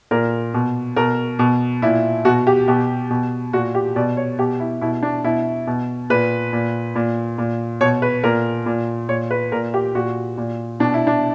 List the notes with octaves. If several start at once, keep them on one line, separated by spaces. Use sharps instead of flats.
A#2 A#4
B2
B2 A#4
B2
A#2 E4
B2 F#4
G4
B2 G4
B2
A#2 F#4
G4
B2 D5
C#5
B2 G4
E4
B2 E4
D4
B2 E4
B2
A#2 B4
A#2
A#2
A#2
B2 C#5
B4
A#2 A#4
A#2
A#2 C#5
B4
A#2 A#4
G4
A#2 F#4
A#2
B2 D4
E4
D4